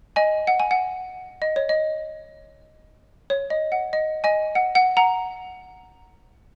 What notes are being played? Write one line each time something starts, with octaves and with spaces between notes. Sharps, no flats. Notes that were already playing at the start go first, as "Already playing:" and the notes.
D#5 G#5
F#5
G#5
F#5
D#5
C#5
D#5
C#5
D#5
F#5
D#5
D#5 G#5
F#5
F#5
F#5 A#5